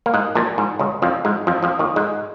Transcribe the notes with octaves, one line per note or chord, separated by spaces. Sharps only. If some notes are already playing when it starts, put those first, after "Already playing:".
A#3
G#2 G#3
A#1 A#2
G#2
C#2 C#3
F2 F3
G#2 G#3
F2 F3
F2 F3
D#2 D#3
G#2 G#3